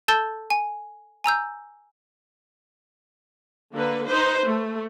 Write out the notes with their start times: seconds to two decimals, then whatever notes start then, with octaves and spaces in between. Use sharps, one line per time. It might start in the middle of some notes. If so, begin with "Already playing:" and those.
0.08 A4 A5 E6 G6 A6 G7
0.50 G#5
1.24 G#5 A#5 E6 G6
3.74 D3 A#3 B4
4.07 D#4 B4 C5
4.45 A3